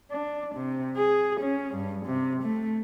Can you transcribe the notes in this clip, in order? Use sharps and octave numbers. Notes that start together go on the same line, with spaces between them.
D4
C3
G#4
C#4
G2
C3
A3